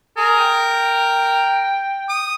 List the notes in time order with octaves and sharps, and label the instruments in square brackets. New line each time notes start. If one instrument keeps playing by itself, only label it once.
[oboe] G#4 [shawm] A#4
[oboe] G5
[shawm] D#6